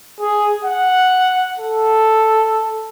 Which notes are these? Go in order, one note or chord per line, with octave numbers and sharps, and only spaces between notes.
G#4
F#5
A4